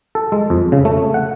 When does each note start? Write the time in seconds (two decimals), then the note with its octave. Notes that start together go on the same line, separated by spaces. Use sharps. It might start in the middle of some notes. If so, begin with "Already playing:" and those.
0.15 A4
0.32 G#3
0.50 F2
0.72 C#3
0.85 A3
1.14 F#5